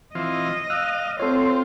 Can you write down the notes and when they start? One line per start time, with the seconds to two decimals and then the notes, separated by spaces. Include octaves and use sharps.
0.15 E3 C4 F4 D#5
0.70 F5 E6 F#6
1.19 C4 F4 A4 C5 C#5